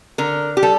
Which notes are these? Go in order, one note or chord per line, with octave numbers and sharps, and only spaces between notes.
D3 A#4
G4
G3 A4